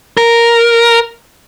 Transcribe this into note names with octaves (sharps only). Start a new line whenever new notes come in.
A#4